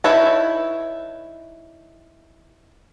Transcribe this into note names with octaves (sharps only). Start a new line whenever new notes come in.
D#4 E4 B4 C#5 A5